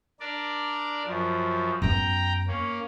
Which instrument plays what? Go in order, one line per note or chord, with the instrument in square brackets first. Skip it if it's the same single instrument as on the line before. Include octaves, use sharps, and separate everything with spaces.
[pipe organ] D4 A#4 D5
F#2 F3
[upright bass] F#2 B3 [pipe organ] G5 A#5
[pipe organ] A#3 C#4